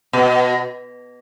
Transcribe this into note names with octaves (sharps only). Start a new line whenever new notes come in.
B2